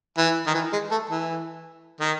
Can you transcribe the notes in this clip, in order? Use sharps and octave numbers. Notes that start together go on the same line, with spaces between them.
E3
D#3
E3
G#3
A3
E3
D#3